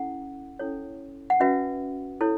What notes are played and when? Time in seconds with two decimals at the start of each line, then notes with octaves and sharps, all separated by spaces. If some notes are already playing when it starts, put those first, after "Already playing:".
Already playing: C#4 E4 A4 F#5
0.59 C#4 E4 A4 C#5
1.30 F#5
1.40 C#4 F#4 B4 E5
2.21 E4 A4 C#5